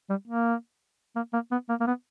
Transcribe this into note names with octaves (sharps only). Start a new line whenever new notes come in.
G3
A#3
A#3
A#3
B3
A#3
A#3
B3